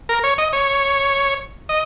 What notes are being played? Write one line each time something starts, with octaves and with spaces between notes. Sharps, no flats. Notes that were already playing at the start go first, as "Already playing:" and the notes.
A#4
C#5
D#5
C#5
D#5